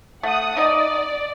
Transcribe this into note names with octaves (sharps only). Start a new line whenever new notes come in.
A3 F#5 D#6
D#4 D5 D#5